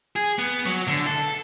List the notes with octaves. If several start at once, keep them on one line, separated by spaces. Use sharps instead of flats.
G#4
B3
F#3
D3
A4